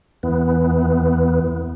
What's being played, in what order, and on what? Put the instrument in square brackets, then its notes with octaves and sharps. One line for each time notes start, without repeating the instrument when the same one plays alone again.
[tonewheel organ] E2 E3 B3